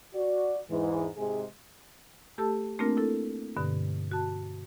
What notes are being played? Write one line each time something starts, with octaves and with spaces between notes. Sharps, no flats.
F#4 D5
E2 G#2 E3
G#2 C3 G#3 G#4
A3 G4 A4 A5 E6
A3 A#3 C4 D4 F4 A#4
E4 A4
G2 B2 D3
F#4 A5